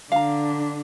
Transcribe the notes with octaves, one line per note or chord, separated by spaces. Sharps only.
D3 D4 F5 A#5